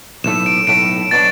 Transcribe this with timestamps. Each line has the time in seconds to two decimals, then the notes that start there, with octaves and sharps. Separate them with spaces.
0.24 B1 A2 A3 E7
0.46 D7
0.67 B1 A2 A3 D7
1.11 B2 F#3 D4 A6